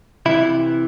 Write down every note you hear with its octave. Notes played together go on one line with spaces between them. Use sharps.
C3 E3 E4